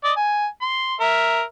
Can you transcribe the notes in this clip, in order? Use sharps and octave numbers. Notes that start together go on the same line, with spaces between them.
D5 D#5
G#5
C6
A#4 E5